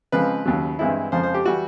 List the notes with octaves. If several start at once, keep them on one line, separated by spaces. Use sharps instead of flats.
C#3 F3 G#3 C4 B4
D#2 C#3 F#3
G2 E3 G#3 C4 E4
F2 C#3 F3 G#3 C5
C5
G4
E3 G3 F#4